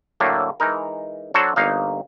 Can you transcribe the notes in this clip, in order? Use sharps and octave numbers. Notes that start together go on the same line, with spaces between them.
A2 D3 F#3 A3 A#3
E3 G#3 D#4 A#4
F#3 D4 F#4 A4 C5 C#5
G1 A#3 D#4 F5